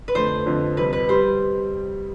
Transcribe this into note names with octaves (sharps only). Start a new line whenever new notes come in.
B4
F2 D3 A3 D4 C5
F2 D3 F3
F2 C3 G3 B4
B4
G3 C5